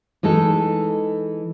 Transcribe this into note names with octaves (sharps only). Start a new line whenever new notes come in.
E3 G#3 D#4 A4